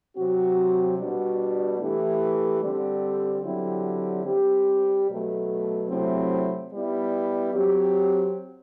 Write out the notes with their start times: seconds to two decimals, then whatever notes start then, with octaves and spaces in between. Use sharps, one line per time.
0.16 C3 F#3 C4 F#4
0.98 B2 G3 D4 F#4
1.80 E3 A3 E4 G4
2.62 D3 G3 C4 G4
3.43 D3 F#3 C4 E4 G4
4.25 G3 C4 G4
5.08 B2 F#3 A3
5.89 C3 F#3 A3 C4 E4
6.72 G3 B3 E4
7.54 F#3 C4 G4